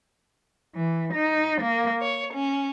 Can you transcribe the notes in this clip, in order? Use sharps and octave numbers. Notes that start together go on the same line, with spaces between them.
E3
D#4
A#3
C#5
C#4